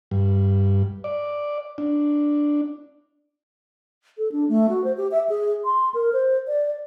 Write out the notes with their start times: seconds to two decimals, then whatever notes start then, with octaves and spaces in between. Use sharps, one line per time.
0.11 G2
1.04 D5
1.78 D4
4.18 A4
4.32 D4
4.49 A3
4.69 F#4
4.84 C5
4.97 G4
5.12 E5
5.29 G#4
5.65 C6
5.94 A#4
6.13 C5
6.48 D5